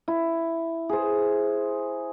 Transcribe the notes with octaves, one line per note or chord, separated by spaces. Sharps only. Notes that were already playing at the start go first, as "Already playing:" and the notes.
E4
G#4 C5